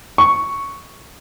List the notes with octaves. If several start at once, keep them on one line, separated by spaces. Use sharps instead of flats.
C#6